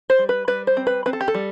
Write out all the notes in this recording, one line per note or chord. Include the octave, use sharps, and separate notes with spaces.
C5
G3
B4
G3 B4
C5
C4
B4
C4 B4
A4
G4
A4
G3